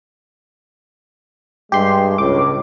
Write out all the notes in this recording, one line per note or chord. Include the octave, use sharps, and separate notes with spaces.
G2 G#3 G4 C6
C#2 A2 D6